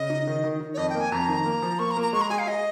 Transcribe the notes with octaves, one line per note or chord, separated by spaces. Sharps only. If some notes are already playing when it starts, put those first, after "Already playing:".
Already playing: C#3 D#5
D#4
D#3
D#3
D#3
C#5
F2 D#5
A#3 G5
G#5
F2 A#5
D#3
A#3
F3
A#3 C#6
A#5
A#3
A#5
G#3 C#6
A#5
G#4 G#5
F5
G#4 D#5